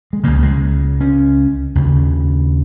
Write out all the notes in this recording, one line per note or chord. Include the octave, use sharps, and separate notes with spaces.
G#3
C#2 C#3 A#3
G#3
C#4
D#2 C#3